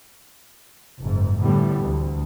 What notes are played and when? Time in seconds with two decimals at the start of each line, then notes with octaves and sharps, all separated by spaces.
1.00 F#1 G#2
1.41 A2 D3 E3 G3 B3
1.83 D2